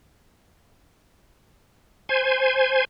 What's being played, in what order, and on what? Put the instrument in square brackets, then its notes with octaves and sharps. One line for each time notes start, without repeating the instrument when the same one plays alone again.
[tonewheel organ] C5 G#5